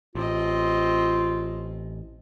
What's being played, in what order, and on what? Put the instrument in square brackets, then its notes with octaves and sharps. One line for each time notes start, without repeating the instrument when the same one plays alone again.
[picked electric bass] A1 [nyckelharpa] C4 D#5 [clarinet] F4